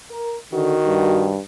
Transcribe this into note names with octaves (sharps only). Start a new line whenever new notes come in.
A#4
D3 D#3 F#4
G2